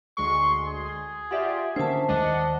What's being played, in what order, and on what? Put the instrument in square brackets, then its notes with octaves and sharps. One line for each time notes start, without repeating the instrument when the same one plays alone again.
[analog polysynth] D2 G#3 C6 [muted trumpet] C#6
[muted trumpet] G#4
[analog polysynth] F4 G4 D5 [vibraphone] E5 F#5
[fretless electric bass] D3 D4 [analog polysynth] A#3 C#4 E5 [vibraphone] C5 A5
[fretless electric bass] D#2 D#3 G#3 [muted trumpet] D4 [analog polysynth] D#5 F#5